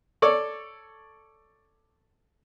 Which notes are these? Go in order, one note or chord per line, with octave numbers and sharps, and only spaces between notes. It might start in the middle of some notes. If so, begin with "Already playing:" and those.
A4 C#5 D5